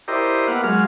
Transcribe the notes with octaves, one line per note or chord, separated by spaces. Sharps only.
E4 G4 A#4 C5 D5 D#5
A#3 B3 F5 F#5 D6
F#3 G#3 F5 F6